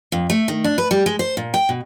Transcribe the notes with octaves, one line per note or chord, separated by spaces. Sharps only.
F2
A3
D#3
D4
B4
G3
G#3
C5
A#2
G5
B2